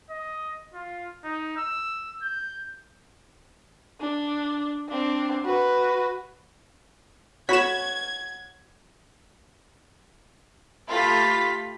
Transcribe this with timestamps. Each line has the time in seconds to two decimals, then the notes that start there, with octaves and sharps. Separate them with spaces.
0.11 D#5
0.74 F4
1.24 D#4
1.57 E6
2.22 G6
4.00 D4
4.89 C4 D4
5.45 F#4 B4
7.49 F#4 C#5 B5 G#6 B6 E7
10.89 A3 F4 G4 B5 A6 B6